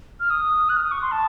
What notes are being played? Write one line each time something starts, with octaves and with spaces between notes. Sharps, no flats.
F6
D#6
F#6
F6
D#6
C#6
C6
A5